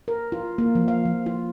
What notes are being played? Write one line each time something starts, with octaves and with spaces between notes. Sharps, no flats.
A#4
F4
A#3
F3
F5
F3
F4